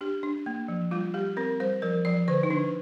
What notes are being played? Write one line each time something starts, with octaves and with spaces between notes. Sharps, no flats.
D4 G4
D4
A#3
F3
G3 F4
G3 G4
C4 A#4
G3 C5
F3 A#4
F3 D5
D3 C5
D#4
D3 D4